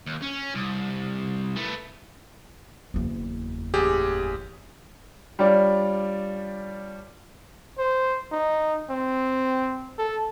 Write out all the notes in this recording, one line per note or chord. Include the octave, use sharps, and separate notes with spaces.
D#2
C#4
C2
A3 B3
F#1 E2
A1 G4 G#4
G3 D4 F4 C#5 D5
C5
D#4
C4
A4